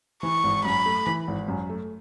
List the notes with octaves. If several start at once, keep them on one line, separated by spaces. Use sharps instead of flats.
E3 C#6
G#1
F#2 B5
A3
E3
G#1
F#2
A3